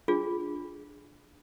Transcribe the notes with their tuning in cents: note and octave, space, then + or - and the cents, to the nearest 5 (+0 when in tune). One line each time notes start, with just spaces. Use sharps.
D4 +0 F4 +0 G#4 +0